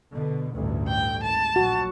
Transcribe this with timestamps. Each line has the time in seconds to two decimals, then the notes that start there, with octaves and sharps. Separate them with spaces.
0.13 B2 D3
0.53 A1 D2 G2
0.88 G5
1.23 G#1 A5
1.56 A#1 F#3 F#4